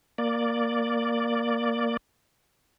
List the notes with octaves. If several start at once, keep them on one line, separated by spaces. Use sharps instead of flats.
A#3 D5